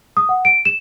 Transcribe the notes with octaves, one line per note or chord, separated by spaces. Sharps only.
D#6
F#5
D7
E7